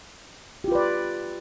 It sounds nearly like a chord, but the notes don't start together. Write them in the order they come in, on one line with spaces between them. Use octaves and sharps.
G4 F4 B4 D5